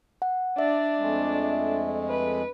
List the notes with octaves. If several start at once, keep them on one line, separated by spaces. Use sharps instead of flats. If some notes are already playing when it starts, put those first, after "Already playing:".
F#5
D4 D5 E5
F2 G#3 A3
B4